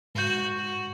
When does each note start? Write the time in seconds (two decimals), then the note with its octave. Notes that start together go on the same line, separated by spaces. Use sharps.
0.15 G#2 F#4 G6
0.56 F#4